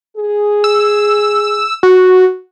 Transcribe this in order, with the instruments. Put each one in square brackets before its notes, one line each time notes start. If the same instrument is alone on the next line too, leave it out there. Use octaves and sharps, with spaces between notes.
[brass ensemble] G#4
[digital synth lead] E6
F#4